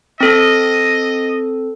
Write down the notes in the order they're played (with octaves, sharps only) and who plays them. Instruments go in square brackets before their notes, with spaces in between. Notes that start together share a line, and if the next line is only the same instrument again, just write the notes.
[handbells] C4 A4 [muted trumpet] D#5